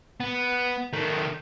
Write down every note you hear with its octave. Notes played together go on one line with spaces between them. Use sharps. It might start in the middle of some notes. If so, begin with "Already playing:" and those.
B3
D#3 A3